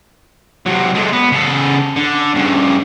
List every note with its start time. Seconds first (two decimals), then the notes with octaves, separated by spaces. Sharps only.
0.66 C3 F#3
0.95 G#3 A3
1.13 B3
1.32 C#3 A4
1.96 D3
2.35 G2 C#3